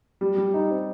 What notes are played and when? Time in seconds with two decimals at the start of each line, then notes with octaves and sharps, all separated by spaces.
0.21 G3
0.37 G3
0.54 D#4
0.70 C4